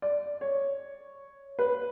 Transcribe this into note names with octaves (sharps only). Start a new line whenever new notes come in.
D5
C#5
B4